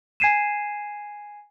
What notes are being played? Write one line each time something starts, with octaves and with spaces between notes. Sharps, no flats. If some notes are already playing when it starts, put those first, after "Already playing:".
G#5 G#6 C7 D#7 E7